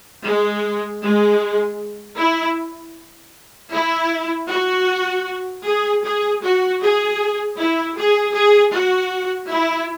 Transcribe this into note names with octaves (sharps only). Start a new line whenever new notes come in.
G#3
G#3
E4
E4
F#4
G#4
G#4
F#4
G#4
E4
G#4
G#4
F#4
E4